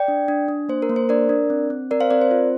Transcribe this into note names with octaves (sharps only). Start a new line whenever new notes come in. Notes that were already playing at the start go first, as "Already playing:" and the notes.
Already playing: D5 G5
D4
D4
D4
A#3 C5
A#4
A#3
C5
D4 A#4 D5
D4
C4
C4
C4 A#4 D5
C5 F5
C4 A#4 D5
C5
F4